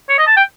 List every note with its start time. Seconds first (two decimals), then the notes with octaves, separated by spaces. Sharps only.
0.09 C#5
0.18 D#5
0.27 A5
0.36 G5